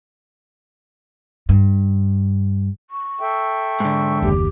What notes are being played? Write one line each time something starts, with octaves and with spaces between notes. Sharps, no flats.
G2
C#6
A4 E5 G5
G#2 D3
F#1 D#2 G4